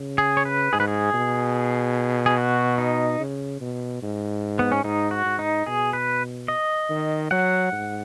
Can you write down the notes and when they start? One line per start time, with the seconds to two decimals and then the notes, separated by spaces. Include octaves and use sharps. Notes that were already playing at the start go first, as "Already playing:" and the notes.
Already playing: C#3
0.18 G#4
0.37 C#5
0.45 B4
0.73 G#2 G#4
0.80 B4
0.88 G#4
1.13 B2
2.26 G#4
2.37 F#4
2.78 D#4
3.19 C#3
3.61 B2
4.02 G#2
4.59 B3
4.72 C#4
4.84 G#2 D#4
5.11 F#4
5.26 G#2
5.39 D#4
5.66 B2 G#4
5.93 B4
6.48 D#5
6.90 D#3
7.31 F#3 F#5
7.72 G#2